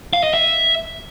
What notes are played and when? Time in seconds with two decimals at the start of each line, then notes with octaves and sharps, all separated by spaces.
0.13 F5
0.24 D#5
0.34 E5